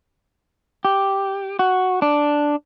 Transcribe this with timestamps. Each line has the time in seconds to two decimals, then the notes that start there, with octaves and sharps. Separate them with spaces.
0.85 G4
1.59 F#4
2.02 D4